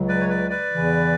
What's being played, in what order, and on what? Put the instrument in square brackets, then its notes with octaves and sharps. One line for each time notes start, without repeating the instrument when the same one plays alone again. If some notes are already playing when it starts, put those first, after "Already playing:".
Already playing: [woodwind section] C#2 C#3 F#3
[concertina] B4 D5
C#5
B4 D5
B4 D5
[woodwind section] E2 C#3 E3